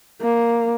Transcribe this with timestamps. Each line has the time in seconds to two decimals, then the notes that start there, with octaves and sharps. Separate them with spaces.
0.22 A#3